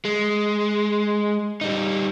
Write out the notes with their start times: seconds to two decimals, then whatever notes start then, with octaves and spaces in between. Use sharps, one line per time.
0.05 G#3
1.61 G3 D#4